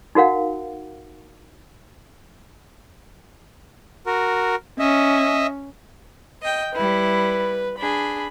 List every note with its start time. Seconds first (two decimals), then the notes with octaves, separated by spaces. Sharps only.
0.15 D#4 F#4 A#4 F5 F#5
4.07 F#4 A#4
4.79 C#4 D#5 E5
6.42 D#5 G5
6.74 G3 E4 B4
7.78 D4 G#4 B5